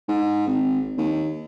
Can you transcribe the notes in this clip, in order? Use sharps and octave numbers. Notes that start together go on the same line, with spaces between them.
G#2
G#1
D#2